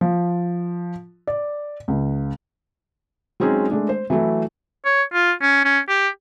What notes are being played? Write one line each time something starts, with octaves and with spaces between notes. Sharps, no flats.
F3
D5
C#2
F#3 G#3 C4 C#4 D#4 G#4
G#3 A3 D4
C5
E3 F#3 A3 E4
C#5
F4
C#4
C#4
G4